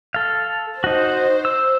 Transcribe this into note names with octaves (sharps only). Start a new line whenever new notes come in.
A4 F5
D#4 F#4 C5
E6